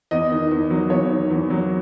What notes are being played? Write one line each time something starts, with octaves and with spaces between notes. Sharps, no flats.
E2 D#5
D#3
E2
F#3
E2 C#5
D#3
E2
F#3